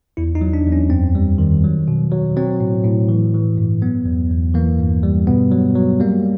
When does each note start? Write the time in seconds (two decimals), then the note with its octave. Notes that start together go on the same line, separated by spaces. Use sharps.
0.17 E2 E4
0.35 D#4
0.41 F#3
0.54 D4
0.66 E2
0.72 C#4
0.90 F#2 C4
1.15 G3
1.38 D#3
1.64 F#3
1.88 B2
2.11 F#3
2.36 F#3 C4
2.60 A2
2.84 A2
3.09 E3
3.34 E3
3.58 G2
3.82 F#3 B3
4.06 E2
4.31 E2
4.55 E3 A#3
4.79 G2
5.03 G3
5.27 B2 B3
5.51 F#3
5.75 F#3
6.00 G3 A#3